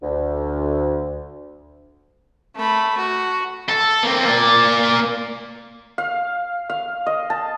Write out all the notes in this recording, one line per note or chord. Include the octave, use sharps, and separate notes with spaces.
D2
A3 B5
F#4
A4
A#3 C4
A#3 D5
F5
F5
D#5
A5